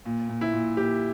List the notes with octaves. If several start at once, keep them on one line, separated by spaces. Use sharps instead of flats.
A#2
A#2
E4
A#2
A#2 G4